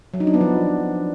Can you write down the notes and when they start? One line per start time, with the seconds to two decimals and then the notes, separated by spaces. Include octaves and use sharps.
0.14 F#3
0.20 D#4
0.27 D4
0.34 B3
0.41 F3